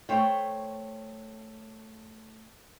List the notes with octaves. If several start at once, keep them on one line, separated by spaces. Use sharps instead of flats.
A3 C5 C#5 G5